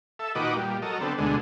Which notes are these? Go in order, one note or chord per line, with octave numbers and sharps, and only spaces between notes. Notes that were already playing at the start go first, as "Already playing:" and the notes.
A4 E5
A#2 D#3 F#4 B4 D#5 D6
A#2 G3
F#3 A4 A#4 D#5
D3 B3 C4 A4
D2 B2 D3 G#3